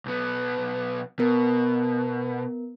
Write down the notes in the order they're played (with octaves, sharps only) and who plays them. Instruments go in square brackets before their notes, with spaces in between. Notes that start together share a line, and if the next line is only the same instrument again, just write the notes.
[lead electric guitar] B1 B3
[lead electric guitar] B2 [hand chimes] B3 A#4